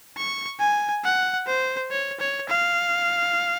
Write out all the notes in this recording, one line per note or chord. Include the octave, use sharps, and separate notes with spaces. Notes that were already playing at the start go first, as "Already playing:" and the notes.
C#6
G#5
F#5
C5
C#5
C#5
F5